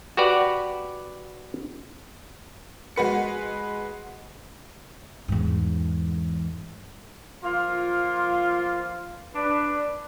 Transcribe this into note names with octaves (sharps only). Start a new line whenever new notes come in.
F#4 G4 B4 D5 F#5
G#3 F#4 B4 C#7
E2 G#2
F3 A#3 F4
D4 B4